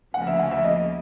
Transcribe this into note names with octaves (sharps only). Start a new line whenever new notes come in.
D2 C#3 F3 A#3 F#5
E5
F#5
E5
D#5